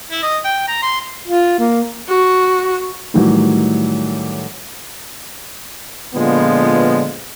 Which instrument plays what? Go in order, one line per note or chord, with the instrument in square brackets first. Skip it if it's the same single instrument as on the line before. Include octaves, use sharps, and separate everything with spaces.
[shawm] E4
D#5
G5
A#5
C6
[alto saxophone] F4
A#3
[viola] F#4
[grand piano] A2 D#3 E3 F#3 G3
[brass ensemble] A#2 D3 F3 G#3 B3